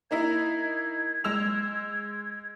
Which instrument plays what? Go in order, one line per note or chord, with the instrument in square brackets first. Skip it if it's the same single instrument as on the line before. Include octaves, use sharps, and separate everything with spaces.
[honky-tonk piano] A#3 D#4 E4 [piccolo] G#6
[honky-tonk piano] G#3 E6 F7